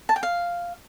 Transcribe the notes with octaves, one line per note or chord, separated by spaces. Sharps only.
A5
G5
F5